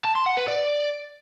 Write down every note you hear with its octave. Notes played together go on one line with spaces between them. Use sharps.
A5
C6
F#5
B4
D5